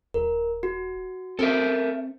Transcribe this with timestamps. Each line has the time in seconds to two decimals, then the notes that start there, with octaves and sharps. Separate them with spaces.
0.14 D#1 A#4
0.63 F#4
1.39 C4 A4 A#4 E5